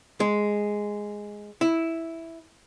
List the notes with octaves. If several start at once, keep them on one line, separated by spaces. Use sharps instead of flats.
G#3
E4